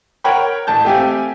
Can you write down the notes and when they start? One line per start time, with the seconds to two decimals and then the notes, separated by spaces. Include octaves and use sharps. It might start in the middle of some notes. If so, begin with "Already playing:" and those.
0.24 A#4 C#5 F#5 G5 B5
0.67 A1 A5 G6
0.85 A3 C4 G4 F5 G5 G#5